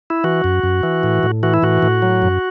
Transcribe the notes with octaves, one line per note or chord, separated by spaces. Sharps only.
E4
E3 F#4
F#2
F#2
E3
A2
A2
E3 F#4
E4
A2 F#4
A2
F#3
F#2